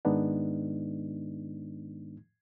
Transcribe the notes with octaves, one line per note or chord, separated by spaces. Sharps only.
G#2 D#3 G#3 B3 D4 D#4